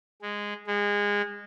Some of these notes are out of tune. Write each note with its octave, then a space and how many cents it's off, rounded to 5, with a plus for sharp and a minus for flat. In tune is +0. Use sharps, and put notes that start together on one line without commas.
G#3 -10
G#3 -25